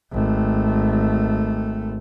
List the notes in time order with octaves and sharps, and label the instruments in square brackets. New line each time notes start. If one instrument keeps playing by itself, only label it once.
[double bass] G#1 A3